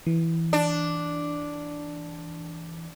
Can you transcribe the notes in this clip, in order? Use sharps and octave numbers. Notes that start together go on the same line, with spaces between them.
E3
D4